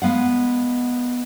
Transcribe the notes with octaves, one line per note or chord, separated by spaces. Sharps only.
G#3 B3 F5 F#5